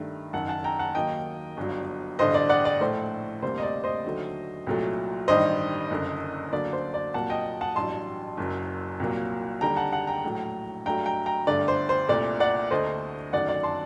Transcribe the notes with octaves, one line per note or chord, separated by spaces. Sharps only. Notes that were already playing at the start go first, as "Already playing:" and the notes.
Already playing: G2 D#3 A3
F#1 F#2 D#3 F#5 A5
F#5 A5
G5 A#5
F#5 A5
D#2 D#3 F#3 A#3 D#5 G5
G1 G2 F#3
A1 G2 D3 C5 D#5
D5
D5 F#5
D5
A#1 A2 A3 C5
D2 C3 G3 A#3 C5
D#5
D5
C5 D#5
D#2 D3 F#3 A3
C2 A#2 F#3 A3
A1 G2 D#3 G3 C5 D#5
F#1 F#2 D3
D2 D3 F#3 A#3 D5
C5
D5
C2 A#2 F#3 A#3 F#5 A5
D#5 G5
F#5 A5
A1 G2 F#3 A5 C6
F#1 F#2 F#3
C2 A#2 F#3 A#3
D#2 D3 G3 G5 A#5
F#5 A5
F#5 A5
G5 A#5
A#1 A2 F#3 A3
G2 F#3 A3 G5 A#5
G5 A#5
G5 A#5
G1 G2 D3 A3 D5
C5
C5
C2 A#2 A3 D5
D5 F#5
D2 D3 A3 C5 D#5
G1 F#2 D#3 F#3 A3 D5 F#5
D5
A5 C6